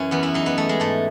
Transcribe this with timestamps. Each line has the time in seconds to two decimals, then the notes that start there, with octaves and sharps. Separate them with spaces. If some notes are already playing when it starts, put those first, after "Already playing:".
Already playing: F#2 E3 C#4
0.11 E2 B3
0.23 E4
0.34 F#3 D#4
0.46 B3
0.57 E3 A3
0.69 G#3
0.80 G#2 A3